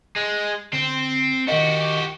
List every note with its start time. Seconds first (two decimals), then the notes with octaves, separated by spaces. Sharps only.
0.16 G#3
0.73 D3 C4
1.48 D#3 F#4 G4 A#4 D#5